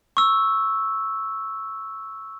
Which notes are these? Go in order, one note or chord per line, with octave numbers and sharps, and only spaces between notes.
C#6 E6